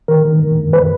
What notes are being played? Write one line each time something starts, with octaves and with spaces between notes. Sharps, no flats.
D#3 A#4
D#3
F#2
F#2
B4